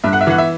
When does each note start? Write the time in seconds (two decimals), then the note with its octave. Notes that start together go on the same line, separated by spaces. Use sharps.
0.04 G2 E5
0.13 F#5
0.21 E5
0.27 E3 F#5
0.38 E5